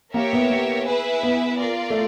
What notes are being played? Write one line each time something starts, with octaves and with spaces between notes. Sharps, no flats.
A#3 G4 A#4 C#5 E5
B3
B3
E4 G#4 B4 E5
B3
F4 A#4 D5
A3